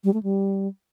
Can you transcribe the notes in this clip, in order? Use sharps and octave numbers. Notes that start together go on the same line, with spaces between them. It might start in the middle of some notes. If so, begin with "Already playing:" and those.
G3
A3
G3